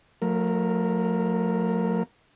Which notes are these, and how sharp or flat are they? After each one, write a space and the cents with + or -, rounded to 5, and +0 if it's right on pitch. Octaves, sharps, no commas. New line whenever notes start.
F#3 -45 A3 +25 A#4 +0